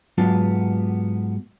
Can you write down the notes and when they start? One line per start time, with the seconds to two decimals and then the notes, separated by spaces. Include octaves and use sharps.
0.18 G#2 F#3 B3 F4 G4 A5